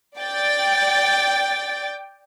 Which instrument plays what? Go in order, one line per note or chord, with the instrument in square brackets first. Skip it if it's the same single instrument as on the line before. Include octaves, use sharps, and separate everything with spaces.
[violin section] D5 G5 A6